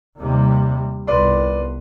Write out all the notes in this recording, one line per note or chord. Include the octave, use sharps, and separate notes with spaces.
D#2 C3 G3
G1 C2 B4 D5 C6